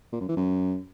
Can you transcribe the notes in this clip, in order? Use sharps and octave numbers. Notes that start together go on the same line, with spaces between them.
A#2
F#2
E3
F#2